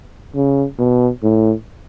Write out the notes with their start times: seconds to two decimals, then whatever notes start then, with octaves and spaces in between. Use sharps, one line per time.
0.35 C#3
0.79 B2
1.22 A2